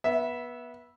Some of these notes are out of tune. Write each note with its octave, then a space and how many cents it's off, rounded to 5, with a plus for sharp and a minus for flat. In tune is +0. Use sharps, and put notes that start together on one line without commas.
B3 -20 E5 +0